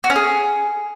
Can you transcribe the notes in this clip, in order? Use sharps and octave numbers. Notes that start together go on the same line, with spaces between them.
F#4
C#4
G#4